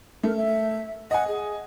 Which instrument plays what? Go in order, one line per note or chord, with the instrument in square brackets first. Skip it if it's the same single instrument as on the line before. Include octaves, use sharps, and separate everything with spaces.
[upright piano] A3 [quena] A#4
[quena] E5
[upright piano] D#5 G#5 [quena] F#5
[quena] G#4